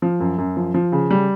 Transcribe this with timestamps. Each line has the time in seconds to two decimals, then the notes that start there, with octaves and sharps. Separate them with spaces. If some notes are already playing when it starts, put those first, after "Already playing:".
0.02 F3
0.20 F#2
0.38 F#2
0.57 F3
0.74 F3
0.92 C#3
1.11 G3